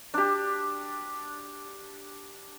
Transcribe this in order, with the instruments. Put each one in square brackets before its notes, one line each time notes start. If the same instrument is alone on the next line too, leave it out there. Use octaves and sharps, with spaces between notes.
[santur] D4 G4